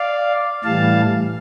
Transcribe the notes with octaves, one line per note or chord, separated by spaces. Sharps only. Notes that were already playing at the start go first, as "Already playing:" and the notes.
Already playing: D5 F5
A2 E3 G3 F5 A5